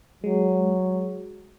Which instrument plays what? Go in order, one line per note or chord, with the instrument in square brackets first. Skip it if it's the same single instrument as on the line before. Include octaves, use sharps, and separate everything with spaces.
[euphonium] F#3 [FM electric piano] G#3